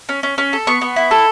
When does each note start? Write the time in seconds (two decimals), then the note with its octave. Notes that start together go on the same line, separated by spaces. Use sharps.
0.09 C#4
0.23 C#4
0.38 C#4
0.53 A4
0.67 B3 C#6
0.81 B3
0.96 E4
1.11 A4